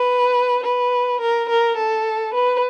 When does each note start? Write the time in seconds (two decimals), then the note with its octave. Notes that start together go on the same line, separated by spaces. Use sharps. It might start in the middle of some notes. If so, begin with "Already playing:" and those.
Already playing: B4
0.64 B4
1.21 A#4
1.50 A#4
1.77 A4
2.34 B4